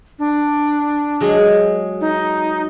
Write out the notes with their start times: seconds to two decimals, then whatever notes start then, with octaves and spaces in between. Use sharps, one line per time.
0.19 D4
1.21 F#3 G#3 G#4
2.01 D#4